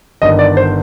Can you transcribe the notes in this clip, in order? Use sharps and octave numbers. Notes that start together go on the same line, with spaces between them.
G1 G2 D#3 D#5
D5
C5